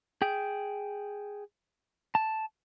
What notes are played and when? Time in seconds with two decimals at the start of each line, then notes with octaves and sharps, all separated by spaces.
0.22 G#4 G5
2.15 A5